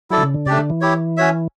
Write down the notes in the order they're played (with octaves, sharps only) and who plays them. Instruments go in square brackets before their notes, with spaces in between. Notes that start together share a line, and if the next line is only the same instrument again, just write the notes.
[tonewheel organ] F#3 [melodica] E4 A4 D5
[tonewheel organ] D3
C#3
D3
[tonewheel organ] C#3 [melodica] A3 D4 G4 D5
[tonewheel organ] D3
E3
[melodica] E4 G4 C#5
C#4 F#4 C#5 E5